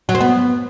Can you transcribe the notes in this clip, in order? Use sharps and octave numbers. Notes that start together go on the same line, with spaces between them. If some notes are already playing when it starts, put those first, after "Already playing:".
F#3
C4
B3